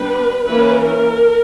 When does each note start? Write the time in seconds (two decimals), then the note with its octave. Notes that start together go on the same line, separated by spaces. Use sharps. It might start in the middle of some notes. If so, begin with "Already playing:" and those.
Already playing: G3 B3 D4 B4
0.46 E3 A#3 C#4 B4
0.83 A#4